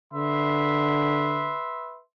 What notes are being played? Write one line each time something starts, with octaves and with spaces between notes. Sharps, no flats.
D3 B4 E5 C6